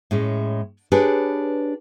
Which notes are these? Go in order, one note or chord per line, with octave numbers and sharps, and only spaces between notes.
A2 G#3 C#4
D4 G4 G#4 B4 C#5